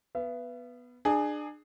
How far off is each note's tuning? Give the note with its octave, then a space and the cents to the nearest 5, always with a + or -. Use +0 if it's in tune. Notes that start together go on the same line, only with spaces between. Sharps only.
B3 +0 E5 +45
D4 +30 G#4 +0